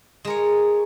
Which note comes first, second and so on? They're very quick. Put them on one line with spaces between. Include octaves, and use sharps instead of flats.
G#3 A#4 C#5